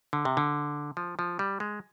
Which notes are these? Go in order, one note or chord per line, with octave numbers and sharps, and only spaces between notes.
D3
C3
D3
F3
F3
G3
G#3